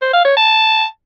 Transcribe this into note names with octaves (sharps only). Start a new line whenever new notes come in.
C5
F5
C#5
A5